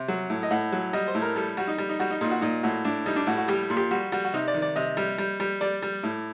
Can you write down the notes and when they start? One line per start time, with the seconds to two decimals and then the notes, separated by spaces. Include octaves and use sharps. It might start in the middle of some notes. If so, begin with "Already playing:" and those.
Already playing: C3
0.08 F#3
0.30 A2
0.43 D#5
0.51 A2 F#5
0.72 F#3
0.93 G3 D#5
1.08 C5
1.15 A2
1.22 A#4
1.36 G3 A4
1.57 G3 F#4
1.68 D#4
1.78 G3
1.89 D#4
2.00 G3 F#4
2.11 D#4
2.21 A#2 D#4
2.31 F#4
2.41 A#2 D#4
2.63 A2 F#4
2.85 A2 D4
3.06 G3 D#4
3.16 D4
3.27 A2 F#4
3.38 F#4
3.48 G3 G4
3.70 A#2
3.77 G4
3.91 G3 F#4
4.12 G3 F#4
4.25 F#4
4.34 C3 D#4
4.48 D5
4.54 D#3
4.62 D5
4.76 C3 D#5
4.97 G3
5.18 G3
5.40 G3
5.61 G3 D5
5.82 G3
6.03 A2